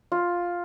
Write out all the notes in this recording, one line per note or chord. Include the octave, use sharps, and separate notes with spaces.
F4